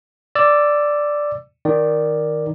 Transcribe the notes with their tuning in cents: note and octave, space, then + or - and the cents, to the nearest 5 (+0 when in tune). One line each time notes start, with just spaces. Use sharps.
D5 +0 E6 +15
D#3 +0 D5 +5